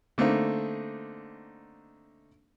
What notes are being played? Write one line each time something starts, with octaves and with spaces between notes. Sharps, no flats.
D3 A3 A#3 C4 D#4